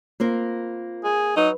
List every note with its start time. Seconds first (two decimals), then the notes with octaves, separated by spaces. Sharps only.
0.20 A#3 C4 F4 A#4
1.04 G#4
1.37 F#3 D#4 B4 C6